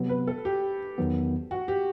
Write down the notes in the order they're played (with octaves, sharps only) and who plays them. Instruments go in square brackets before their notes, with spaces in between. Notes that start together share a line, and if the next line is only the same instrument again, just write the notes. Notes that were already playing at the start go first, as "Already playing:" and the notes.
Already playing: [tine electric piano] C3 F#3 B3
[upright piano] B4
A4
G4
[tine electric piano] E2 D#3 F#3 B3
[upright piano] F#4
G4